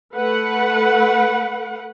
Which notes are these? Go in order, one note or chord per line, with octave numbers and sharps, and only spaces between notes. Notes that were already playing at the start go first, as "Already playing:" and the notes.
A3 B4 F#5